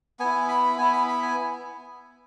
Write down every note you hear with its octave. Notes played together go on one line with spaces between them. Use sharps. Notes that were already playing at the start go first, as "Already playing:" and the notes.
B3 E4 G#5
B5
B3 E4 G#5
B5
B5
G#5